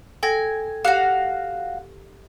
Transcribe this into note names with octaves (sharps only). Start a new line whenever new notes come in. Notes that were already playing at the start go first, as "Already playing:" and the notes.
A4 G5 G#5 A#6
F#4 G4 F5 F#6 C#7